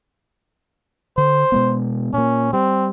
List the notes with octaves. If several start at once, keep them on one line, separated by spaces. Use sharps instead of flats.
D3 C5
B2 G#3 B3
A#2 A#3 C#4
G3 C4